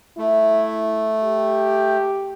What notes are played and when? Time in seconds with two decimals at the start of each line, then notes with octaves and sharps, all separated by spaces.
0.18 A3 E4
1.24 G4